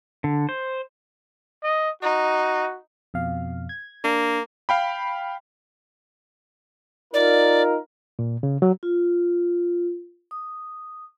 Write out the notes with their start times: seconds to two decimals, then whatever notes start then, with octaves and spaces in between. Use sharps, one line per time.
0.24 D3
0.49 C5
1.63 D#5
2.03 D#4 F#4
3.14 F2 B2 F5
3.69 G#6
4.04 A#3 D4
4.69 F5 G5 B5
7.14 D#4 F4 A#4 D5
8.19 A#2
8.43 C#3
8.62 F#3
8.83 F4
10.31 D#6